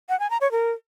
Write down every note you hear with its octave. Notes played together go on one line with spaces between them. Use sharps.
F#5
G#5
A#5
C#5
A#4